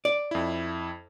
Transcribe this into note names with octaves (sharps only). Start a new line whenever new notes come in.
D5
F2 E4